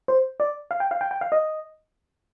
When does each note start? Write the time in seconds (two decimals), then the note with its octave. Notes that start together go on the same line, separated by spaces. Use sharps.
0.08 C5
0.40 D5
0.71 F5
0.80 G5
0.91 F5
1.01 G5
1.11 G5
1.21 F5
1.32 D#5